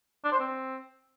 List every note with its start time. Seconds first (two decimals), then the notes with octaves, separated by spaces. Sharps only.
0.24 D4
0.32 C5
0.40 C4